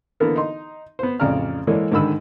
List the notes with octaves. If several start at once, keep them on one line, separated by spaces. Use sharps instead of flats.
D3 E3 A#3 B3 A4 A#4
D#4 C6
B3 C5
A1 F2 C#3 D5 A#5 F6
E3 G#3 A#3 A4 C#5 D5
G#2 D3 D#3 B5 E6